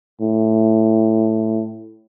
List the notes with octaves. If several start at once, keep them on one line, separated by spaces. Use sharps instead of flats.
A2